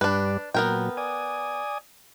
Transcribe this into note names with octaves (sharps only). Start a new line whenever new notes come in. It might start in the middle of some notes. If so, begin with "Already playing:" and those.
G2 G3 D4 B4 D5
A#2 F#3 B3 A#4 G5
D5 G#5 D#6